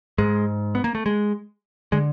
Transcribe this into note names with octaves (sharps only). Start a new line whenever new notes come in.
G#2 G#3
B3
A#3
A3
G#3
D3 G#3